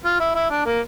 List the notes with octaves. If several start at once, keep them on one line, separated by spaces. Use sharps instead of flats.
F4
E4
E4
D4
A#3